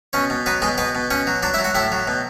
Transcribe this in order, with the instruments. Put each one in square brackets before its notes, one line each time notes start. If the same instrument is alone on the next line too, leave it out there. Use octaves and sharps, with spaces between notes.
[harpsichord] B2 C#4 C#5
B2
F#3 B3 B4
B2 G#3 G#4
B2 B3 B4
B2
B2 C#4 C#5
F#3
F#3 D4 D5
E4 E5
F#3
F#4 F#5
A2 E4 E5
F#3
B2